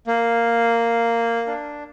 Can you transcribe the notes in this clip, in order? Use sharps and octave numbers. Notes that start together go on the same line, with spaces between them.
A#3
D4